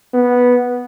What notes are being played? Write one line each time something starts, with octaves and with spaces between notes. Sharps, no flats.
B3